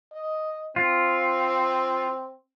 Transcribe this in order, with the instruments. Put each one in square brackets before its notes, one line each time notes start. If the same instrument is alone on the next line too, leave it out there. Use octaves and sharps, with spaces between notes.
[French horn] D#5
[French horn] C4 [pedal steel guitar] F4